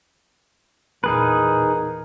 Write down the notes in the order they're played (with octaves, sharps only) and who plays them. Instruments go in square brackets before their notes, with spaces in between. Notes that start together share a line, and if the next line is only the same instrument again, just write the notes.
[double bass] E2 A#2 [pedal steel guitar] D#4 G#4 B4 [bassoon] A#4